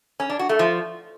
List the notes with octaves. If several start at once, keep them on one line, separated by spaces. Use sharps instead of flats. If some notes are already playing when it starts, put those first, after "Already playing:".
C#4
D4
F#4
A3
F3